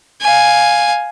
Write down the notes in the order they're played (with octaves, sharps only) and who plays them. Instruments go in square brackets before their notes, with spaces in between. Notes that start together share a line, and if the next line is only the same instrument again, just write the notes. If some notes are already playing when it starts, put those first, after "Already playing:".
[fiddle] F5 G#5